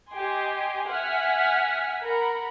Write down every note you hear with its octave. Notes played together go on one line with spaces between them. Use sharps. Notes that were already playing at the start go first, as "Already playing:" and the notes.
G4 D#5 G#5 C6
E5 F#5 G#5 F6 B6
A#4 F#5 B5